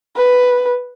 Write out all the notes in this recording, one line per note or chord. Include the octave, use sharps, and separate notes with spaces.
B4